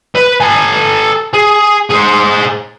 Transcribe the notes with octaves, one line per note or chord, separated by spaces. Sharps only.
B4
A4 G#5
G#4
G#4 C5